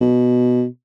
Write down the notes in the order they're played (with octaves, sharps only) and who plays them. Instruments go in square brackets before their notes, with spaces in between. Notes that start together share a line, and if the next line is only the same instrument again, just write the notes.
[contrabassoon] B2